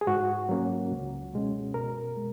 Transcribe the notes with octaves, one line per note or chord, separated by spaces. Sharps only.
G#4
G#2 F#4
F#3 A#3 C#4
C#2
B2 G#3 C#4
B2 A#4
G#3